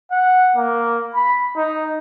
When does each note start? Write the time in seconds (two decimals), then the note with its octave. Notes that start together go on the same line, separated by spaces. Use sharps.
0.11 F#5
0.56 A#3
1.15 B5
1.56 D#4